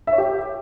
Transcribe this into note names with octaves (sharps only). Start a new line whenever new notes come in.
E5
C#5
G4